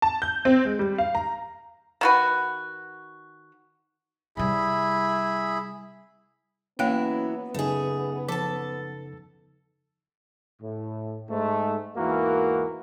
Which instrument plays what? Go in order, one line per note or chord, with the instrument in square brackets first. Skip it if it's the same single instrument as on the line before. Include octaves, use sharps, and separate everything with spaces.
[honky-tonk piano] A5
G6
C4
G#3
G3
F5
A#5
[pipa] D#3 F#4 B4
[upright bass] C3 G3 [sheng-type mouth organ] E4 G#4 B5
[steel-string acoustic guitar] E3 F#3 E4 [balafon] A#3 G5 [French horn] B3 [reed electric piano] C#4
[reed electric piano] F#2 C#3 D#4 [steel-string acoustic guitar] A3 G#4
[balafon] F3 [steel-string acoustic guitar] A4 A5
[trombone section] A2
G#2 A3
E2 G#2 E3 A#3 F#4 A#4